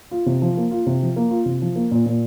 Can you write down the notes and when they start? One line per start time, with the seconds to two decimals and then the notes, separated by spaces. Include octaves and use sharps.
0.11 F4
0.26 C3
0.42 F3
0.57 A#3
0.71 F4
0.87 C3
1.02 F3
1.16 A#3
1.31 F4
1.46 C3
1.62 F3
1.76 A#3
1.91 A#2
2.06 A#2